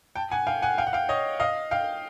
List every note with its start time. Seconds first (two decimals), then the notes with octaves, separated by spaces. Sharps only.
0.15 G5 A5
0.32 F#5 G#5
0.47 F5 G5
0.62 F#5 G#5
0.78 F5 G5
0.87 F#5
0.93 F5 G5
1.09 C#5 D#5
1.40 D#5 F5
1.71 F5 G5